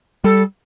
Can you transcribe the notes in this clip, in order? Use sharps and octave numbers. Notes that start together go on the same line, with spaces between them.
G3 A4